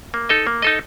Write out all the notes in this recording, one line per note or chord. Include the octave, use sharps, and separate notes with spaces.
A#3
D#4 A4 D#5
A#3
D#4 A4 D#5